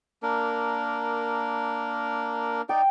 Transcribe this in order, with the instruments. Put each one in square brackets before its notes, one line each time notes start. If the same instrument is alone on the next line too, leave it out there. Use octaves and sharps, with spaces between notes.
[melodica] A#3 D4 A#4
[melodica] D#4 D5 [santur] G5